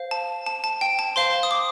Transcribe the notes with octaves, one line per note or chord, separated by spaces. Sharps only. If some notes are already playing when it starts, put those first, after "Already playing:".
Already playing: C5 F5
A5
A5
A5
G5
A5
C5 F5 C6
D#6
D6